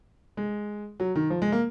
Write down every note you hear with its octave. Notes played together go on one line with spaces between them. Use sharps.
G#3
F#3
D#3
F3
G#3
A#3